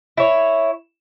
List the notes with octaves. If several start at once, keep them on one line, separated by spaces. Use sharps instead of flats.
E4 C#5